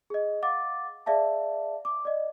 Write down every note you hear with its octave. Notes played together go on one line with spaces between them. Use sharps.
G#4 D#5
F5 F#5 D6 A6
G#4 D5 E5 F5 A5
D6
D5 D#5